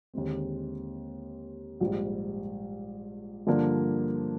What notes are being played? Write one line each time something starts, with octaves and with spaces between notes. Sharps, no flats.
D#2 D3 G#3 C4
A#1 G#2 G3
G2 D3 F3 A#3 D4